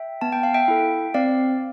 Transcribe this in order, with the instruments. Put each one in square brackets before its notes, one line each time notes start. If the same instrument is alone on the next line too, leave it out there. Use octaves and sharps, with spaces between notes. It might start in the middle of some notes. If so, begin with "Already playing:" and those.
Already playing: [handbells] E5 G5
B3 A5
G5
F5
E5 G5
E4 A4
C4 D5 F5